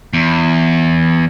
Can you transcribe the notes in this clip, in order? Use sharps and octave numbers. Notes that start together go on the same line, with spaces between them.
E2